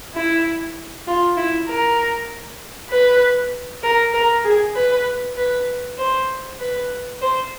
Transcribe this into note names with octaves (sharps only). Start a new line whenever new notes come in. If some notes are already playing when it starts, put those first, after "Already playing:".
E4
F4
E4
A#4
B4
A#4
A#4
G#4
B4
B4
C5
B4
C5